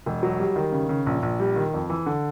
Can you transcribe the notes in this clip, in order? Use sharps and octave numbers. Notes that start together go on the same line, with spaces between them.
E1
F#3
G3
D#3
C#3
C#3
A#1
A#1
G3
D#3
F2
E3
D3